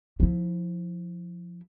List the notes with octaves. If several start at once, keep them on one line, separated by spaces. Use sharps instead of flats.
F3 E4